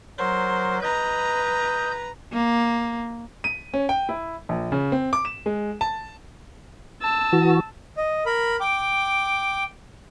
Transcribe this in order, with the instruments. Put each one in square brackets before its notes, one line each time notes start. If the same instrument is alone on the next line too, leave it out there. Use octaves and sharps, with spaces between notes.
[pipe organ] F#3 A#4 [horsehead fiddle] C5
[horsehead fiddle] B4 A#5 [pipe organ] D#5 G6
[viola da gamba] A#3
[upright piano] D#7
C#4
G5
E4
A#1
C#3
C4
D6
E7
G#3
A5
[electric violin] A5 E6
[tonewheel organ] E3 F#4
[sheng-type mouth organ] D#5
A#4 B5
G5 D6